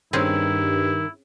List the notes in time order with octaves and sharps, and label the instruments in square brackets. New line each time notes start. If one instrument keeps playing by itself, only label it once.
[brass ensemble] G2 [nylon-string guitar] D#3 [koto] C4 C#4 G#4 [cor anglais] E4